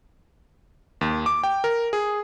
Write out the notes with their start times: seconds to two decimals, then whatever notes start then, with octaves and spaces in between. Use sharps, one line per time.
1.01 D#2
1.26 D6
1.43 G5
1.64 A#4
1.93 G#4